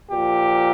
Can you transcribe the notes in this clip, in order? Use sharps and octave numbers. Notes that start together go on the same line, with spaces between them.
A#2 F3 G4